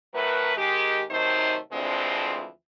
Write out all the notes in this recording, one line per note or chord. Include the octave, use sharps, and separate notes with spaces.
A2 F#3 A3 A#4 B4
D#3 G#3 G4
C3 D#3 F#3 A3 D#4 C5
D2 E3 F3 G#3 C4 D4